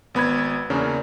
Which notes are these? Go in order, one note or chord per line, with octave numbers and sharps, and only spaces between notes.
G#1 B3 B5 G#6
E2 C#3 A#3 C#4 D4